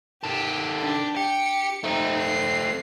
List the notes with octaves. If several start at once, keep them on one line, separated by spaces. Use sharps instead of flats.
D#3 G4 A4
D4 G4
G4 C#7
A3 C4 D#4
C7